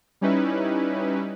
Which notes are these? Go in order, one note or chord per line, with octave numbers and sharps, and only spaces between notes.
G3 C#4 D#4 E4 B4